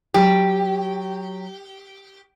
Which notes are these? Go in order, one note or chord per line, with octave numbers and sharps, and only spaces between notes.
F#3 G4